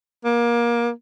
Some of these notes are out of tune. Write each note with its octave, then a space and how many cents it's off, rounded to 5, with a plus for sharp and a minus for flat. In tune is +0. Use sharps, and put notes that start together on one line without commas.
A#3 +25